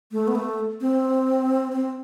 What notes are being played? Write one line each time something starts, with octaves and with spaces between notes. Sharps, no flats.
A3
B3
A3
C4
C4